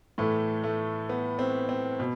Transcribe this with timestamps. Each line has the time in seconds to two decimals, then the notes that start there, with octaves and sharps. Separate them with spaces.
0.18 A2 E3 A3
0.64 A3
1.09 B3
1.39 C4
1.69 C4
2.00 B2